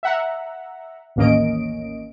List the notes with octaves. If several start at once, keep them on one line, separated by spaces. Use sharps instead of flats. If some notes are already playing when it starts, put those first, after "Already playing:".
E5 F#5 A#5
A1 D#2 A#3 C#4 D#5 D7